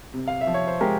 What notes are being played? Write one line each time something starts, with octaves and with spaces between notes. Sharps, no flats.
C3
F5
E5
F3
C#5
C5
G#3 G4 A#4